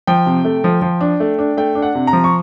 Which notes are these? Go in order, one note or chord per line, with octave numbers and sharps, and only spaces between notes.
F3 G5
C3
A3
F3
F3
D4
A3
D4
A3 G5
D4
F#5
C3
A#5
F3
C#6